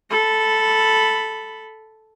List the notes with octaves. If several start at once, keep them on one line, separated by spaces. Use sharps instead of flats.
A4 B5